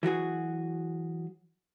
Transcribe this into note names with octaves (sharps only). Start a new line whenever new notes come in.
E3 F#3 F#4 G#4